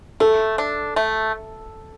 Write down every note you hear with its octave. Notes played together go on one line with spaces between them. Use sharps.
A3 A4
D4
A3